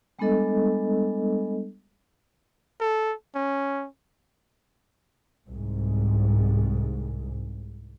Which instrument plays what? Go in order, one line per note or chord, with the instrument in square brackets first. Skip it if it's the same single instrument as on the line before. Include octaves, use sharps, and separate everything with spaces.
[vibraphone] G3 G#3 B3 D4 A4 D#5
[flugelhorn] A4
C#4
[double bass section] C2 G#2